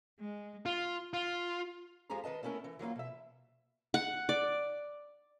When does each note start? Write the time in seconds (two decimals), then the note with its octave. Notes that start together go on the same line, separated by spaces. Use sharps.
0.20 G#3
0.66 F4
1.13 F4
2.10 F2 F3 G#3 F4 G4 A#5
2.24 D#3 B4 D#5 A5
2.43 A3 B3 C#4 E4 A#4
2.64 E3
2.79 E3 F#3 A#3 F4
2.96 B2 E5
3.94 F#5
4.29 D5